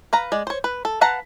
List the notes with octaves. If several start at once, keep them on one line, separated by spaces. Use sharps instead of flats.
B4 F5 A#5
G#3 D5
C5 C#5
B4
A4
B4 F5 F#5 A5 A#5